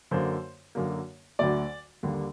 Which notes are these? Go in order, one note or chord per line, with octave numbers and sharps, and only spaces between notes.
F#2 D3 F#3 A#3 C5
F#2 D3 F#3 A#3
D2 D3 F#3 A3 D5
D#2 D3 G3 A#3